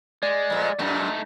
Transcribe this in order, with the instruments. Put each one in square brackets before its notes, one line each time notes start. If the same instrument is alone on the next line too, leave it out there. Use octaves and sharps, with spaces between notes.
[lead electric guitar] G#3 [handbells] D5
[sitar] F2 A#2 B3
[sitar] F#2 A#2 [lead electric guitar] A3 D#4